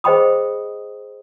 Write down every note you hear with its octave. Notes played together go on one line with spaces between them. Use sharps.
G#4 C5 D#5 G5 B5 D#6